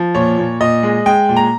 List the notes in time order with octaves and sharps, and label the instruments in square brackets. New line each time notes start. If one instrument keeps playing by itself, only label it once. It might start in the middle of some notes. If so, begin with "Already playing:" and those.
Already playing: [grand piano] F3
A#2 C#5
A#2
A#2 D#5
G#3
G#3 G5
A#2
A#5